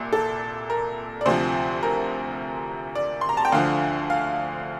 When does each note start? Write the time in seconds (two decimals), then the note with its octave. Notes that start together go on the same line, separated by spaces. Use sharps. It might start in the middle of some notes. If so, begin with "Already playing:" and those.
Already playing: C2 A#2
0.13 A4
0.70 A#4
1.21 D5
1.26 D2 C3 F3 C5
1.83 A#4
2.95 D5
3.21 C6
3.29 A#5
3.37 A5
3.45 G5
3.52 D2 D3 F3 F5
4.10 F5